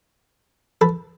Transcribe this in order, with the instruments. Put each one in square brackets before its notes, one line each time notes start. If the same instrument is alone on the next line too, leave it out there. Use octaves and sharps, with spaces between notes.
[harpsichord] A4 B4